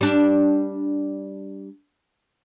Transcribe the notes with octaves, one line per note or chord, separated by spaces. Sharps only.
G3 D4